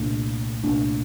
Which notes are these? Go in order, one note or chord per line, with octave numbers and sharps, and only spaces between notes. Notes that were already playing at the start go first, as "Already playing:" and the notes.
Already playing: C2 A#2 A3 D4
C2 A#2 A3 D4